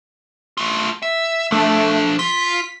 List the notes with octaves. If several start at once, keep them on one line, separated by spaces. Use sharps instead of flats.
A3 F4
E5
F3 A3 D4
F4 B6